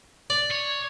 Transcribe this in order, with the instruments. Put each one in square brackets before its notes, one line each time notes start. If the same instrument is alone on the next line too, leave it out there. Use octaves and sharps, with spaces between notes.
[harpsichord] D5
[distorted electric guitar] C#5